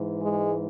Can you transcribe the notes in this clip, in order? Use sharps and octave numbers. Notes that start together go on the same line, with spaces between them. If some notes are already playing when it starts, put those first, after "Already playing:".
Already playing: G#2 E3
G#3